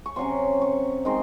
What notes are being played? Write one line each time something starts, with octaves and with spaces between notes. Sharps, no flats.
C#6
C3 F#3 C#4 C6
C#6
D#3 G#3 C4 D#4 C6